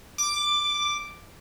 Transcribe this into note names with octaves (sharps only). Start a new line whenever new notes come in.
D6